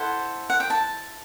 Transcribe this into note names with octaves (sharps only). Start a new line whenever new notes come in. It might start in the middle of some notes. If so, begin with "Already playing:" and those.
Already playing: E4 A4 C5 F#5
F#5
G5
A5